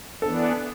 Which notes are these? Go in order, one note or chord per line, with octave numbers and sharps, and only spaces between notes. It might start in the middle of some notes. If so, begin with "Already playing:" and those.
E3 B3 D4 A4